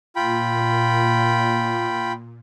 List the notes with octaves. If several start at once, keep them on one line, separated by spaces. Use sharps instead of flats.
A#2 F4 G5 B5